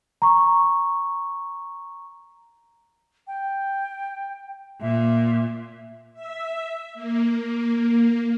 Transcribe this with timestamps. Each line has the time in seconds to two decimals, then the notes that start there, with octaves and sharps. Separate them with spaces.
0.22 A#5 C#6
3.27 G5
4.81 A#2 E5
6.13 E5
6.94 A#3